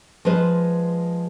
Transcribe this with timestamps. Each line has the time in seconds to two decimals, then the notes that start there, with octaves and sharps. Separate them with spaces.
0.25 F3 G#3 G#4 B4 C5